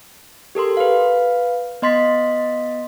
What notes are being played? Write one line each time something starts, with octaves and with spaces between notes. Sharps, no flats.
G4 A4 A#4 C6
B4 F5
B3 D#5 C6 A6 B6